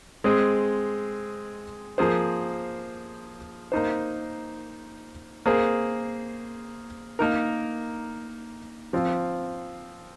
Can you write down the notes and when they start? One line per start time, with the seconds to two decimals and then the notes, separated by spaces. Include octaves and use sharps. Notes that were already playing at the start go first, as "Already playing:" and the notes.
0.24 G#3 C4 G#4
1.98 F3 A#3 G#4 C5
3.72 A#3 D#4 C5
5.46 A#3 G#4 C5
7.19 A#3 D#4 A#4
8.93 F3 C4 F4